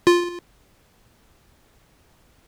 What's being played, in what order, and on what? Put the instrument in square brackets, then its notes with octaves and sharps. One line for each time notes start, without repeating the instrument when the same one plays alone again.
[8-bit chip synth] F4